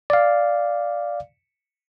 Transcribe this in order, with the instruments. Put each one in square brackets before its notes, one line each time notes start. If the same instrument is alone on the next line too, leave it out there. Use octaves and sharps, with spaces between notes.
[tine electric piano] D5 F5